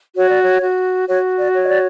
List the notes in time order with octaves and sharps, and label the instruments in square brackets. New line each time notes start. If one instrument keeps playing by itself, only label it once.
[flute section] F#4 C#5
D5
C#5
F#4
F#4 C#5
D5
C#5
D#5
D5